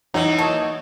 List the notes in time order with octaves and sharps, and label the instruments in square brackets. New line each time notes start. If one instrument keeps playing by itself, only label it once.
[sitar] E3 F#3 [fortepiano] D#4
[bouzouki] A#3 D#4 A5 [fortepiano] C#5 D#6